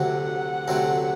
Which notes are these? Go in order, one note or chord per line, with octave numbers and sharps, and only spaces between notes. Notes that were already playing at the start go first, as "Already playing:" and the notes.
Already playing: D2 C3 F#3 C4 F#5
D2 C3 F#3 C4